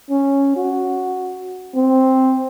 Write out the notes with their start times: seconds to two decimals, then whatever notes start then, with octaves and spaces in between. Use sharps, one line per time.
0.11 C#4
0.56 F#4
1.76 C4